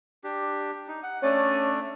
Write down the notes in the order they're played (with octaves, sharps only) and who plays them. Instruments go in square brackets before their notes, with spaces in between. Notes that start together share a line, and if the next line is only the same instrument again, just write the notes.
[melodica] D4 G4
D#4
F#5
[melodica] A3 D4 D5 [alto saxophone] C#4